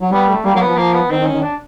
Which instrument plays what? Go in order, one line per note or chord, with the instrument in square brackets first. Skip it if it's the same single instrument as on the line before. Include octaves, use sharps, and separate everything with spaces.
[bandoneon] F#3
[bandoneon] G3 [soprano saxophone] B3
[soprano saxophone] A3
[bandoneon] G3 [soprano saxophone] A#3
[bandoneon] F#3 [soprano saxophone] A#3
[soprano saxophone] B3
[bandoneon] F3
[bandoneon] F3 [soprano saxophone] A#3
[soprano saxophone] B3
[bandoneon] D#3 [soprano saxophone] C4
[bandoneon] D#3
[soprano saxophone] C#4
[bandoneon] D#3
[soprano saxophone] D4